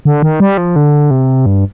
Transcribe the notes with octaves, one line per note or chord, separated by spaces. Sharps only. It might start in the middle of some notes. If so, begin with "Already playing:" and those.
D3
D#3
G3
F3
D3
C3
G2